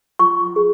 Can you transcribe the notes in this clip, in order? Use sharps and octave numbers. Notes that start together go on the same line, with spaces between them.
F4 C#6
G#4